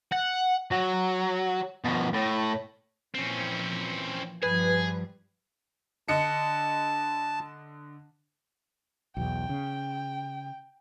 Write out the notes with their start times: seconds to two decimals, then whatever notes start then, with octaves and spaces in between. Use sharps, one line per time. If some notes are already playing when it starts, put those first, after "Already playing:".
0.12 F#5
0.71 F#3
1.84 B2 F3
2.13 A2
3.15 A#2 E3 F3 C4 C#4
4.43 G2 F3 G3 G#4 B4 G#5
6.08 D3 D#5 A5 C#7
9.17 B1 E2 G5
9.49 C#3